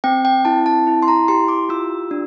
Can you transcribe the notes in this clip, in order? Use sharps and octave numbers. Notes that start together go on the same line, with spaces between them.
C4 G5
G5
E4 A5
A5
E4
C6
A#5
G4 C6
D6
F4 E6
D4